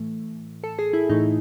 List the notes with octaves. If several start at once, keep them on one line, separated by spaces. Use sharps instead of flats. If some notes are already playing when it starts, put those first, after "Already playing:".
Already playing: A2 E3 A3
A4
G#4
E4
A2 E3 A3 D#4